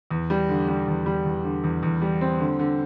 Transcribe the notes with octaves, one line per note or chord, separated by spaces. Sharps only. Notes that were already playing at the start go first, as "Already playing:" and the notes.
E2
G3
D3
G3
E2
G3
E2
D3
E2
E2
G3
C4
D3
D3